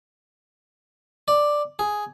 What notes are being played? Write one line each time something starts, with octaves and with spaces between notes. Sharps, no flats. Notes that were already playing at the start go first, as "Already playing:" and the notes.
D5
G#4